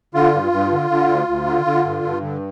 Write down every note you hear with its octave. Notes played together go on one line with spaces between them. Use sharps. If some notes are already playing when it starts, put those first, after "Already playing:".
D3 F4
G2
G2
D3
D3
D2
D2
D3
D3
G2
G2
D3